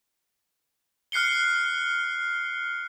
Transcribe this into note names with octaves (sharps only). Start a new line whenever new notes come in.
F6 F#6 C7 C#7 G7